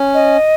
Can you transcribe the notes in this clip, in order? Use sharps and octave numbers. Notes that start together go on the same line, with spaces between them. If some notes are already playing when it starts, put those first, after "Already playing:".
Already playing: C#4
D#5